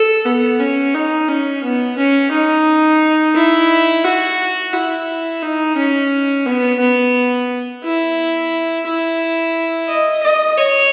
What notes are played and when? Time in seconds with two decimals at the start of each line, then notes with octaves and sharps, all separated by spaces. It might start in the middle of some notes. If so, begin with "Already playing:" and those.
Already playing: A4
0.25 B3
0.59 C#4
0.94 D#4
1.28 C#4
1.63 B3
1.98 C#4
2.31 D#4
3.35 E4
4.04 F#4
4.72 E4
5.42 D#4
5.76 C#4
6.46 B3
6.79 B3
7.83 E4
8.86 E4
9.89 D#5
10.23 D#5
10.58 C#5